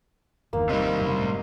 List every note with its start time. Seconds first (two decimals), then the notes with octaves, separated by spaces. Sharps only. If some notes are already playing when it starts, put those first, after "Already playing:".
0.53 G1 E2 D#3 A#3
0.69 C3 G3 D#4
0.99 F1 F#2 C#3
1.19 A2